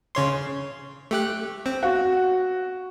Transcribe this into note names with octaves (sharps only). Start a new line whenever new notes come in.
C#3 C#5 C6
A3 G4 F#6
C4
F#4